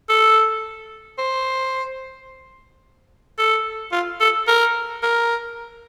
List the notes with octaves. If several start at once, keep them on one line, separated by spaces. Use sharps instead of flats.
A4
C5
A4
F4
A4
A#4
A#4